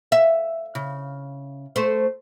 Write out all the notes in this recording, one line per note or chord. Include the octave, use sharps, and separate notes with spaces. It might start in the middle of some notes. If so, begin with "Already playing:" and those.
E5
C#3
A3 C5